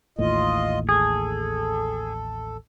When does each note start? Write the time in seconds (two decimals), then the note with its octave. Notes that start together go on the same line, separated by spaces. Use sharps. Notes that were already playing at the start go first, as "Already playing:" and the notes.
0.19 A1 D#2 A2 F4 D#5
0.89 G#4 A4